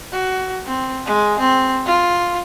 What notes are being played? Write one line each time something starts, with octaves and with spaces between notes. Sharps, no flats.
F#4
C4
G#3
C4
F4